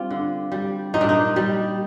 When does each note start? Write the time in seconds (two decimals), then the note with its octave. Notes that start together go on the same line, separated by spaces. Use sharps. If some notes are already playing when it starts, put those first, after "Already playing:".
Already playing: G3 C4 D4 F4
0.11 D3
0.52 G3
0.94 A#2 D#4
1.01 D4
1.09 D#4
1.36 G3